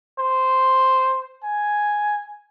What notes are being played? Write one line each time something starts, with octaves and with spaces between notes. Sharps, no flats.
C5
G#5